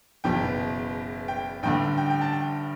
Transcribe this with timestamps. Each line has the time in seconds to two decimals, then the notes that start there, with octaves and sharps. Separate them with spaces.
0.24 F#1 E2 B2 G5
1.28 G5
1.63 A1 G2 D3 G5
1.98 G5
2.10 G5
2.21 A5
2.33 G5